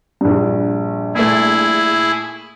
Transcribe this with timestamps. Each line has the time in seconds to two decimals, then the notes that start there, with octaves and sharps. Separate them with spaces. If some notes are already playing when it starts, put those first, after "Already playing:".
0.21 A#1 G2
1.15 A#2 A3 E4 G#4